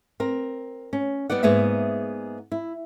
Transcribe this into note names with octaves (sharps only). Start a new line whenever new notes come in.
C4 A#4
C#4
G3 B3 D#4 D5 F#5
G#2 A#3 B3 G#4 D5 E5
E4